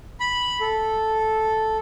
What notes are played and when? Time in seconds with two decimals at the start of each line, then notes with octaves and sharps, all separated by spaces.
0.20 B5
0.61 A4